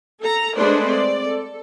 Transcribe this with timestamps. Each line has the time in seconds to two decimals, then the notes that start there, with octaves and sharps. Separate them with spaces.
0.20 A4 A#5
0.55 G#3 A3 D4 B4 C5 D5
0.87 C4 D5
1.25 A4